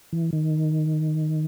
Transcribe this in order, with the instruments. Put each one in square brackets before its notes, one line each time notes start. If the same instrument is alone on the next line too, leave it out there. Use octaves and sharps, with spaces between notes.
[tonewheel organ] E3
D#3